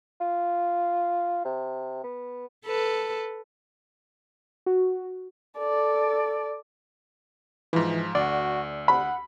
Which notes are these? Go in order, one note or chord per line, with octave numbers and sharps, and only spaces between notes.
F4
C3
B3
A4 B4
F#4
A4 D5
G#2 E3 F3
D2 F#4 D5
F#5 B5